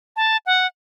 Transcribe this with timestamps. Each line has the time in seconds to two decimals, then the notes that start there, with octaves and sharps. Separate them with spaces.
0.16 A5
0.46 F#5